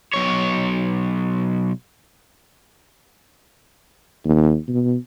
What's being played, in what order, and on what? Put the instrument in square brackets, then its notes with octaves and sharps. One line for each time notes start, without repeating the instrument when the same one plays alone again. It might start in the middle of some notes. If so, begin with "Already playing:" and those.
[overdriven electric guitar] B1 C#5
[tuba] D#2
B2